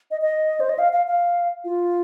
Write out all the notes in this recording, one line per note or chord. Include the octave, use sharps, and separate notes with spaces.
D#5
D#5
C5
D#5
F5
F5
F5
F4